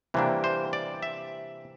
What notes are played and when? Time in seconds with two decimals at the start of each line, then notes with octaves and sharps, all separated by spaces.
0.14 C3 E3 G3 A#3 D4
0.44 C5
0.73 D5
1.02 E5